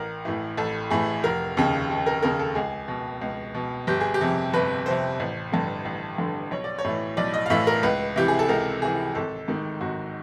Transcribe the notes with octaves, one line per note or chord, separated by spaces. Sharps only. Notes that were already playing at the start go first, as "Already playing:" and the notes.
Already playing: A1 A#4
A2 E3
A1 A4
A2 E3 G#4
F1 A#4
D#2 C#3
F1
A#4
D#2 C#3 A#4
A4
C#2 G#4
B2
C#2
B2
G1 G4
G#4
G4
F2 C3
G1 B4
F2 C3 C5
A1
G2 D3
A1
G2 D3
B1 C#5
D5
C#5
A2 E3
B1 D5
D#5
F5
A2 E3 E5
A#4
C#2 B4
C3 E3 G4
G#4
A4
C#2 A#4
C3 E3 G#4
G#1 A4
G#2 D#3
G#1 F#4